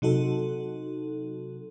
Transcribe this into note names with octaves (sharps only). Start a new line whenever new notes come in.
C3 F#3 D#4 F#4 A4